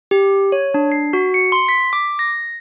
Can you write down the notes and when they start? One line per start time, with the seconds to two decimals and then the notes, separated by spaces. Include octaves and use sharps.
0.11 G4
0.52 C#5
0.74 D4
0.92 C7
1.13 F#4
1.34 C#7
1.52 C6
1.69 B6
1.93 D6
2.19 A#6